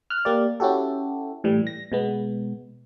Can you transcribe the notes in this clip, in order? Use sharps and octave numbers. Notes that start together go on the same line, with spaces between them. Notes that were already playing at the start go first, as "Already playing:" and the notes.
F6 F#6
A#3 G4 D5
C#4 E4 F#4 G4 A4
A2 E3 G3
A#6
B2 G#3 B3